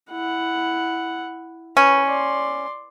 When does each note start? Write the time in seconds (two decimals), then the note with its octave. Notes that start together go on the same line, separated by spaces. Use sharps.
0.11 E4 F#5
1.77 C#4 B4
2.06 D5 C6